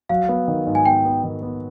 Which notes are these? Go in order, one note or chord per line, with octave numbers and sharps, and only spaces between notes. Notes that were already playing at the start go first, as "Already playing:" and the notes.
F#3 F5
B3
D#3
G#2
G#5
B3 G5
B3
D#3
B3